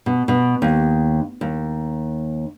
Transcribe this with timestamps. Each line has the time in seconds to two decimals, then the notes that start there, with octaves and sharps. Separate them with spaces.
0.06 B2
0.28 B2
0.62 D#2
1.41 D#2